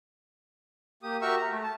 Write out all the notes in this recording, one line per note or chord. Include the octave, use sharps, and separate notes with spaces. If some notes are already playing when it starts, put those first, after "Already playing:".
A#3 G4 D#6
F#4 G4 A#4 E5 C#6 E6
A#5
A3
A5